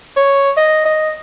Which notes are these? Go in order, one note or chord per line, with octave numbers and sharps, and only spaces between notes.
C#5
D#5
D#5